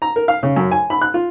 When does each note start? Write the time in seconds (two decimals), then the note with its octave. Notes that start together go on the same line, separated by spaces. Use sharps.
0.02 A#5
0.16 A#4
0.28 F5
0.43 C#3
0.56 F#2
0.71 G#5
0.90 B5
1.01 F#6
1.14 F4